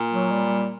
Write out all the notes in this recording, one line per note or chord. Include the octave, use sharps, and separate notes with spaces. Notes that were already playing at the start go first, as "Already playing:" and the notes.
Already playing: A#2
F#3
G3